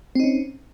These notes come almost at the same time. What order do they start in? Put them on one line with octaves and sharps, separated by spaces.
C4 D#4 C#4